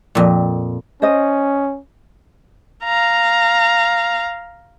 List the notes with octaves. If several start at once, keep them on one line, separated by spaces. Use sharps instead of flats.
F2 A#2
C#4 C5 D#5
F5 A#5